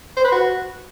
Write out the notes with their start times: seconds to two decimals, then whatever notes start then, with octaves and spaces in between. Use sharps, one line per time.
0.17 C5
0.24 B4
0.32 F#4